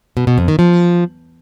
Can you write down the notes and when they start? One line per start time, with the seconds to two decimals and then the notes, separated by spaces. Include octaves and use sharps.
0.17 B2
0.27 B2
0.38 F2
0.48 D#3
0.59 F3